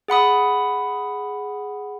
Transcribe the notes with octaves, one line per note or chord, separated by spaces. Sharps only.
G#4 F#5 B5 D#6